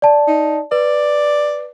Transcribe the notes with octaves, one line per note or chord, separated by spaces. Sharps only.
D5 A5
D#4
B4 D5